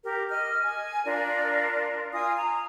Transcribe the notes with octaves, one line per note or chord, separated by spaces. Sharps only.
G4 A#4
D#5 F6
G#5
D4 F4 A#4 D5
F4 G#5 D#6
A#5